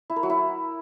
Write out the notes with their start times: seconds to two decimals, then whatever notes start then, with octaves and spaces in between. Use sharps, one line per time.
0.10 E4
0.16 A#4
0.23 F#3
0.30 E4